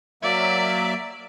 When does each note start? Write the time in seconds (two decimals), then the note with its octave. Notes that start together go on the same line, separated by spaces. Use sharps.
0.23 F#3 A#3 D5 E5